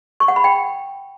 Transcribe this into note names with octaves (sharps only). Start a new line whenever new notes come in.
C#6
F#5
B5
G5